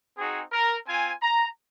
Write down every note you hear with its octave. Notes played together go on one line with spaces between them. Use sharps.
C4 D#4 F#4 G#4
A#4
C4 F4 G#5
A#5